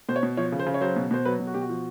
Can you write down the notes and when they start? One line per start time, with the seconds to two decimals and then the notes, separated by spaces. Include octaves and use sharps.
0.09 B2 C5
0.16 C#5
0.23 B2
0.37 F3 C#5
0.52 C#3
0.59 C5
0.66 C#3
0.74 C#5
0.81 F#3 C5
0.96 B2
1.11 B2 C5
1.25 F#3 B4
1.40 B2
1.47 F#4
1.54 B2 G4
1.62 F#4
1.69 F3